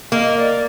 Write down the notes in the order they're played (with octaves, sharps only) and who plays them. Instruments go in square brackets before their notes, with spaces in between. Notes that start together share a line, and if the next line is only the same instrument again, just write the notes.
[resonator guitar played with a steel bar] A#3 [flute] D#5
[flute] D5